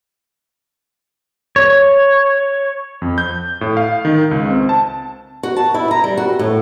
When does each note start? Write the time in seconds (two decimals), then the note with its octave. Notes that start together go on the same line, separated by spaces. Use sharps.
1.56 C#5
3.02 F2
3.18 G6
3.61 A2
3.77 F5
4.05 D#3
4.31 C#2
4.50 C4
4.69 A5
5.43 F#4
5.56 A5
5.74 E4
5.91 A#5
6.04 G3
6.17 F#4
6.39 A2